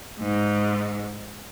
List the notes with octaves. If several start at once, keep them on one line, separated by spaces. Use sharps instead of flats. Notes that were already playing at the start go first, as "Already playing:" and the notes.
G#2